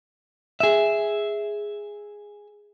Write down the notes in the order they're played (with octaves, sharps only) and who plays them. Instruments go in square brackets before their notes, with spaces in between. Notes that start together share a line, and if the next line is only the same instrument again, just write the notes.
[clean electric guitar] G#4 E5